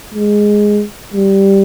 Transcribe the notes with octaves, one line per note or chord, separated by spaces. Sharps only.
G#3
G3